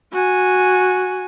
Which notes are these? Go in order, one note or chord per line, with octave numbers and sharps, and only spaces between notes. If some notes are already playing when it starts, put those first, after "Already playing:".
F#4 G#5